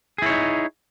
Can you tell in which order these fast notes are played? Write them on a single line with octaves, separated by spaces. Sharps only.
G#4 E4 C#5 D#4